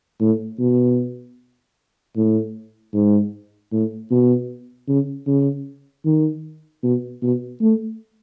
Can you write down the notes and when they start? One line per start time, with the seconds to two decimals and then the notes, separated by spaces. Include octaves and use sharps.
0.21 A2
0.59 B2
2.16 A2
2.94 G#2
3.72 A2
4.11 B2
4.88 C#3
5.27 C#3
6.05 D#3
6.83 B2
7.22 B2
7.61 A3